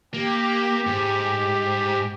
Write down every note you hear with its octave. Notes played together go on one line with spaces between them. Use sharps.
A#3 G4
G#2